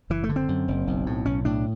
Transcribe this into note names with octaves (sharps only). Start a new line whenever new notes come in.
F#1 E3
A3
D3
C4
F#2
F#1
B1
A2
B1 C#4
A2 D4